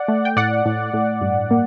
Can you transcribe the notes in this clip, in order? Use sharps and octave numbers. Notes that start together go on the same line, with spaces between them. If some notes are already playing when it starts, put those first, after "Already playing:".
Already playing: D5 F#5
A3
G5
A2 D5 F#5
A2
A2
G2
A#3